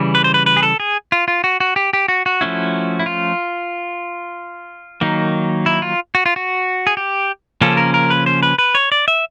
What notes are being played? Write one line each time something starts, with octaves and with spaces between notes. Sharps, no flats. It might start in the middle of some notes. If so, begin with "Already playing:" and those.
Already playing: C#3 E3 G3
B4
C5
B4
B4
G#4
A4
G#4
F4
F4
F#4
F#4
G4
G4
F#4
F#4
F3 A3 C#4 E4
E4
F4
D#3 F#3 A#3 D#4
E4
F4
F#4
F4
F#4
G#4
G4
C#3 F3 A#3 C#4 A4
A#4
A#4
B4
C5
B4
B4
C#5
D5
E5